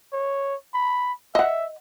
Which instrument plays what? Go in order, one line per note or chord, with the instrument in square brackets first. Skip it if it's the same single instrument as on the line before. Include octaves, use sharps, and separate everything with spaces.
[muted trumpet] C#5
B5
[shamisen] D#5 F#5 [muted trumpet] E5